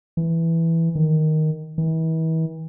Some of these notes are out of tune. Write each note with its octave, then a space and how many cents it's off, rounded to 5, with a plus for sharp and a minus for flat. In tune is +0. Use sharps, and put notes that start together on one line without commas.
E3 +0
D#3 +0
E3 -40